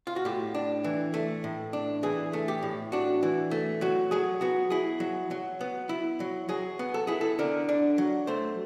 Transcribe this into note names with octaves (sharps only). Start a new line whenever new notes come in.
F4
F#4
A2 G4
D4
E3
A3
A2
D4
E3 G#4
A3
G4
A2
D4 F#4
E3
A3
F#3 F#4
F#3 G#4
B3 F#4
E4 G#4
F#3
F#3
B3
E4
F#3
F#3 G#4
B3
A4
E4 G#4
A4
D3 A#4
D4
F#3
A3 C5